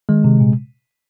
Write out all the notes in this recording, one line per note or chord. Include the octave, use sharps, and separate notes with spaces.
D#3 G#3
C3
A#2